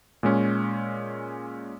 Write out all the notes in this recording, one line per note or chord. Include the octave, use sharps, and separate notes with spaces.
A#2 G#3 C#4